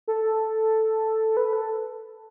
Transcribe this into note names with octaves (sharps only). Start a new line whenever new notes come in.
A4
B4
A4